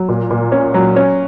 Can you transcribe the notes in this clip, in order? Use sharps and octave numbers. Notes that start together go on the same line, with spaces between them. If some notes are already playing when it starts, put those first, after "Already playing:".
Already playing: F#3
A#2
A#2
C#4
F#3
C#4